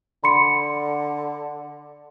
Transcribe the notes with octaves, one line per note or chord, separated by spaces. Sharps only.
D3 B5 C6 C#7